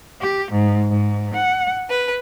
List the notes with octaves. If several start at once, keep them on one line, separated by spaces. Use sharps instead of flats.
G4
G#2
G#2
F#5
B4